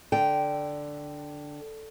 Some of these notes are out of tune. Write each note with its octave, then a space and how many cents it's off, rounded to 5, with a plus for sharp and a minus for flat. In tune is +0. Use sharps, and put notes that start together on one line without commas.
D3 +0 G5 -15